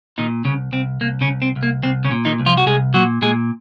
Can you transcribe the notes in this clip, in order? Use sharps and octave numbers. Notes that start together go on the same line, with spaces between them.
A#2 D#3 D#4
C2 C#3 C#4
C2 C4
C2 A#3
C#3 C#4
C2
C4
C2
A#3
C2 C4
C#3 C#4
A#2
D#3 D#4
C2
F3 F4
F#4
C2 G#3 G#4
A#2 F#3 F#4
A#2 G#3 G#4